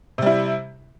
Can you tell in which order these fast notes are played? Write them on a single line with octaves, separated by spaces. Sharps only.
C3 G3 E4